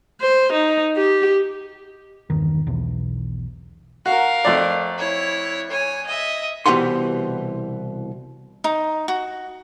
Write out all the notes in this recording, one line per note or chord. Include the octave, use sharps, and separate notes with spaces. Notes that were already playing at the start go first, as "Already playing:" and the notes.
C5
D#4
G4
G1 E2 D#3
B1 E2
F#4 A#4 F5
F2 A3 D5
E4 C#5
C#5 G#5
D#5 E5
C2 B2 E3 G4 F#5 C6
D#4
F#4